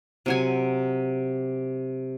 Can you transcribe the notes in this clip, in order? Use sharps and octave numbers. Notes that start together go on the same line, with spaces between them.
C3 F#3 G#5